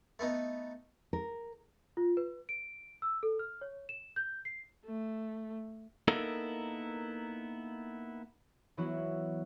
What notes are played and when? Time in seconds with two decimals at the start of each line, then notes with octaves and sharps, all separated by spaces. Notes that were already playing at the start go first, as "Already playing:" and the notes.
0.19 A3 B3 D#4
1.13 A#4
1.97 F4
2.17 B4
2.49 D7
3.02 E6
3.23 A4
3.39 F6
3.61 C#5
3.89 E7
4.16 G6
4.45 C7
4.85 A3
6.08 A#3 B3 D#4 E4 A4 A#4
8.77 E3 F#3 B3 E4 F#4